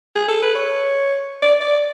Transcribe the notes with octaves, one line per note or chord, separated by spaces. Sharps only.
G#4
A4
B4
C#5
D5
D5